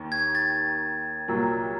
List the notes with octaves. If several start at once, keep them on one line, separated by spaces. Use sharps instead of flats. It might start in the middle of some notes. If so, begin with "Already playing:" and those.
Already playing: D#2 D#3
G#6
A6
C2 A#2 F#3 A#3